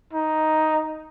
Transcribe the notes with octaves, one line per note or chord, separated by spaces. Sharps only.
D#4